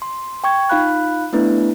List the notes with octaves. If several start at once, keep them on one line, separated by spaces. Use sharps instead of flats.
C6
G5 C#6 G#6
D#4 F4 F5 B5 F#6
A3 B3 D4 E4 B4